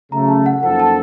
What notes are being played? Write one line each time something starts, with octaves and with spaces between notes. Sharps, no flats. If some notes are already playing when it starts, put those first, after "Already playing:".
C#3 F#3 A3 A#5
A5
F#5
F#2 F3 A#3 D#4 A4 F#5
A5